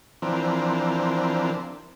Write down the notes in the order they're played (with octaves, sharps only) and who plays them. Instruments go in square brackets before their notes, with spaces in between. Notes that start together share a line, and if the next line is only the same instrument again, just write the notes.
[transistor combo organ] E3 F3 C4 D4 A#4